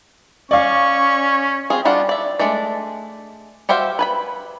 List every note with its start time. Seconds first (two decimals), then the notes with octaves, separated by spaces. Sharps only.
0.51 C#4 D5 F5 C#6
1.70 C4 F4 G#4
1.85 G3 D4 F4 F#4 F#5
2.09 D5 E5
2.39 G#3 A3 D4 D5
3.69 F#4 G4 C5 E5 F5
3.99 B4 G#5 B5